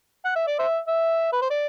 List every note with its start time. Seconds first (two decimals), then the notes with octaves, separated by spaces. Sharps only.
0.25 F#5
0.36 E5
0.47 D5
0.59 C5 E5
0.88 E5
1.33 B4
1.42 C5
1.50 D5